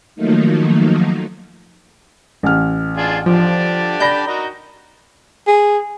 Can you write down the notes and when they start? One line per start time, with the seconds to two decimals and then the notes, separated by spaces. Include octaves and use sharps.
0.15 D#3 F3 F#3 A3 A#3 D#4
2.43 A1 F6
2.97 D4 F4 G#4
3.26 D3 F3 D4 G4
4.00 D5 B5 G6 A#6
4.27 D#4 F#4 A#4
5.47 G#4